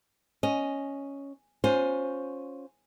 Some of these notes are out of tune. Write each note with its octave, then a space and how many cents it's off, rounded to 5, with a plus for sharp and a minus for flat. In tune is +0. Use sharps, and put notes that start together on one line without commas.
C#4 +0 D#5 +0
C#4 +0 F4 +30 C5 +0